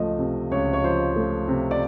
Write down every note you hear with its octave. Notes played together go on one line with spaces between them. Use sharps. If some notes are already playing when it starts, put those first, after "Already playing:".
Already playing: C#2 F3 A3 D#5
C3
C#2 C#5
C#5
F3 C5
A3
C3
D5